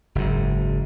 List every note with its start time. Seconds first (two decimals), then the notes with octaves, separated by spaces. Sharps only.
0.15 F#1 G#2